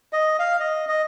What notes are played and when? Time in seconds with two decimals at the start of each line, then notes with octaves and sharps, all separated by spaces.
0.13 D#5
0.39 F5
0.60 D#5
0.88 D#5